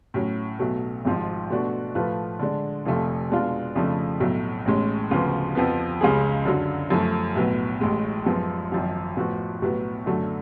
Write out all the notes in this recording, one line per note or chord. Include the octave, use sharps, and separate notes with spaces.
A2 F#3 C#4
B1 B2 F#3 A3
G#1 G#2 F3
B2 A3 D4 F#4
A2 F3 A3 F4 B4
D3 G#3 D4
F1 F2 F3 A3 F4
B2 G#3 D4 F4
F2 C#3 F3 A3 D4
B1 A2 F#3 A3
A1 A2 G#3 C#4
D2 C#3 F3 B3
F2 F3 B3
C#2 C#3 G#3 C#4 G#4
F#2 D3 F#3
F#2 F3 A3
B1 A2 F#3 B3
A1 A2 G#3
F#2 F3 G#3 B3
G#1 F#2 F3
A2 F3 B3 F#4
B1 A2 F#3 B3 F#4
F#2 D3 F#3 A3